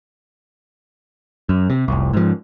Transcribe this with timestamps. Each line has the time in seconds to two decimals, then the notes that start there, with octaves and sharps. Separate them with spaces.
1.49 F#2
1.70 C3
1.88 F1 C2
2.13 G#2 F3